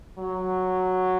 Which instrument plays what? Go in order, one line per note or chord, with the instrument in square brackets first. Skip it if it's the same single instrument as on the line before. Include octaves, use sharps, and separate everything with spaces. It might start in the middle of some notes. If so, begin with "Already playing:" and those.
[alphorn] F#3